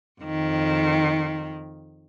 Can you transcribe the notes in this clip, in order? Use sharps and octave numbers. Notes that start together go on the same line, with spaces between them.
F2 D#3